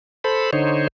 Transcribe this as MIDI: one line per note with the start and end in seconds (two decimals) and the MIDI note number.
0.24 0.51 69
0.24 0.51 72
0.24 0.51 83
0.53 0.88 50
0.53 0.88 63
0.53 0.88 72
0.53 0.88 73